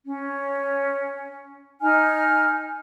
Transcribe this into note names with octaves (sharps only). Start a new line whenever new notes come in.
C#4
D#4 G#5 F6